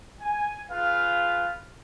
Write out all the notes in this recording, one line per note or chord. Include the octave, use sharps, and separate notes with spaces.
G#5
F4 G#4 B4 F5